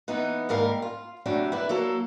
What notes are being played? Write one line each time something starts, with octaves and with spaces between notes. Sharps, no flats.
E3 B3 D#4 B4
D#2 G#2 G3 A#4 F5
F4
C3 F#3 G3 A3 D4
E4 B4 D5
F#3 A#3 A4